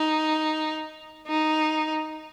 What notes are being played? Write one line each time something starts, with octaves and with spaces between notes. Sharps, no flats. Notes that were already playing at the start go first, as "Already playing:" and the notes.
Already playing: D#4
D#4